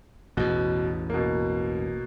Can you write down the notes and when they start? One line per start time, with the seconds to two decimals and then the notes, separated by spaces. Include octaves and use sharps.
0.37 A1 E2 B2
1.10 B2 A#3